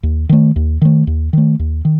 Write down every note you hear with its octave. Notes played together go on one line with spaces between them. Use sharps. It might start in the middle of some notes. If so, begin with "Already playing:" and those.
D#2
D#3 A3
D#2
D#3 A3
D#2
D#3 A3
D#2
D#3